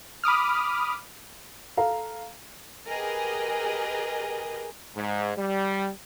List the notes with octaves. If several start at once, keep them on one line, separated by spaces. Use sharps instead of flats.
B5 D6 D#6 F6
A4 F5 A#5
G4 G#4 A#4 B4 D#5
G#2
G3